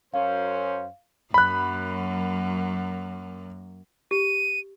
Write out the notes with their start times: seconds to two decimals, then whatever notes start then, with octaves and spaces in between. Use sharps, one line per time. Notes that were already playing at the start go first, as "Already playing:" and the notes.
0.14 F#2 C#4 C5 F5
1.34 F#2 F#3 A#3 B5 F#6
4.11 G4 D#7